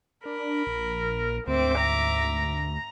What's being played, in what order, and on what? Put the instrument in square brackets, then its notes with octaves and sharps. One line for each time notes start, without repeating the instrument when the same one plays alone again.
[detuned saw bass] D4 [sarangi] A#4 [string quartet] B5
[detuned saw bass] A#1
[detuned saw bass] D2 [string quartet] G#2 E5 D6 [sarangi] C4
[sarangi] A#5